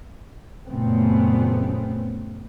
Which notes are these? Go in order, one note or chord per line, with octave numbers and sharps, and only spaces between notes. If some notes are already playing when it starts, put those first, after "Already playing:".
F#2 A#2 C#3 A3 B3 C4